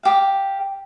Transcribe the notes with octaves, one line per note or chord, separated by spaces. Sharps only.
G4 F5